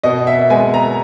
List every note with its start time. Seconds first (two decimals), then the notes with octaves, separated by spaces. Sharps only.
0.03 B2 D#5
0.27 E5
0.50 G#3 B3 G#5
0.74 A#5